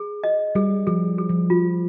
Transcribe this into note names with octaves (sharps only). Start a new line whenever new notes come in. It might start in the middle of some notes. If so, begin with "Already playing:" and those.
Already playing: G#4
D#5
G3 G#4
F3 G#4
G#4
F3
G3 F4